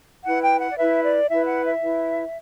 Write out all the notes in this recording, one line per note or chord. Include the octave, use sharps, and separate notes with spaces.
E4 B4 F#5
G5
F#5
D5
E4 B4 E5
D5
E4 B4 E5
F#5
E5
E4 B4